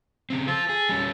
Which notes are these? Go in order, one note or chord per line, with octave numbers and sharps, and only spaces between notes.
C#3 C4
F4 A4 C5
G#4
G3 C#4